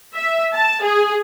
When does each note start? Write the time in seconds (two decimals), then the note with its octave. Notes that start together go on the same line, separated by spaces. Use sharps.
0.15 E5
0.54 A5
0.82 G#4